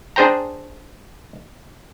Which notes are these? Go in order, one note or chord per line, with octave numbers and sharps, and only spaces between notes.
D4 G#4 C5 G5 A#5